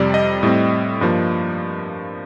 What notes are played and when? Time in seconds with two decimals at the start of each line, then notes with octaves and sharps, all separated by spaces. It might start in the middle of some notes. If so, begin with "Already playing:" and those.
Already playing: F2 C3 G3 D5
0.14 D#5
0.43 A2 G3 C4
1.01 G2 F3 A#3